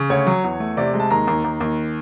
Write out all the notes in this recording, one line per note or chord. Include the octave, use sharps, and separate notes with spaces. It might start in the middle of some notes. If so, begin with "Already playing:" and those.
Already playing: C#3
D2 C#5
F#3
E2
A3
C3 D5
G#3
A5
D#2 A#5
D#2
D#2
D#2